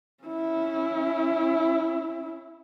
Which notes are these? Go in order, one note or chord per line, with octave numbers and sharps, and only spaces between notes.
C#4 E4